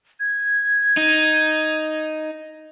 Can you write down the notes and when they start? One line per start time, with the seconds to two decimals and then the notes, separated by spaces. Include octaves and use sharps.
0.20 G#6
0.97 D#4